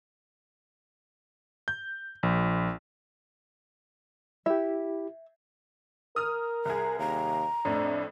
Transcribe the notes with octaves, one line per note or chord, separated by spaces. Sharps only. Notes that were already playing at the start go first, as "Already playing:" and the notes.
G6
A#1
E4 G4 E5
A#4 D#6 F6
C2 G#4 A#5
D#2 A#5
F2 A2 D4